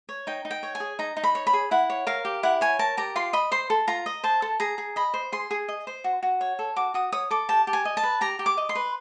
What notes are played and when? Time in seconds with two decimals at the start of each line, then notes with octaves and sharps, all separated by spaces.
0.09 C#5
0.27 D#4 G5
0.45 D#4
0.51 G5
0.63 C#5
0.75 G#5
0.80 G#4
0.99 D#4 A#5
1.17 D#4
1.24 B5
1.35 C#5
1.47 B5
1.53 G#4
1.71 E4 F#5
1.90 C#5
2.07 A#4 F5
2.25 G4
2.43 E4 F#5
2.61 C#5 G#5
2.79 A#4 A5
2.97 G4 A#5
3.16 F4 C6
3.33 D#5 B5
3.52 C5 C6
3.70 A4
3.87 F4 A#5
4.06 D#5
4.23 C5 A5
4.42 A4
4.60 G#4 A#5
4.78 G#4
4.96 D#5 B5
5.14 C5
5.32 G#4 C6
5.51 G#4
5.68 D#5
5.87 C5
6.04 F#4
6.23 F#4
6.41 C#5
6.59 A4
6.76 F#4 D6
6.94 F#4 D#6
7.12 C#5 D#6
7.31 A4 D6
7.49 G4 A5
7.67 G4
7.73 G#5
7.85 D#5
7.97 A5
8.03 B4
8.21 G4 A#5
8.39 G4
8.46 D6
8.57 D#5
8.69 C6
8.75 B4